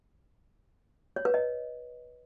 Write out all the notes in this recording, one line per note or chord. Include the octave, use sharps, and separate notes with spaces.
C#5
B4
D#5